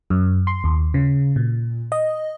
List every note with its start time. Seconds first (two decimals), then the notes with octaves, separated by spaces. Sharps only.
0.10 F#2
0.47 C6
0.64 D#2
0.94 C#3
1.36 A#2
1.92 D#5